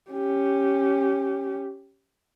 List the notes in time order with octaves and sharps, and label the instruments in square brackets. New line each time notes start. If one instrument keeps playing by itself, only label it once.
[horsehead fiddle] C#4 G4